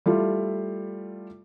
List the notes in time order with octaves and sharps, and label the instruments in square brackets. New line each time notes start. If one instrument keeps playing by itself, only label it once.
[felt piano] G3 A3 E4 F4